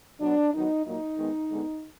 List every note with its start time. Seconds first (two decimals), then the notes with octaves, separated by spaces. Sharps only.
0.20 B2 F#3 B3 D4
0.53 D#3 F#3 B3 D#4
0.85 A#2 F#3 A#3 D#4
1.18 D#3 G#3 B3
1.50 D3 G#3 B3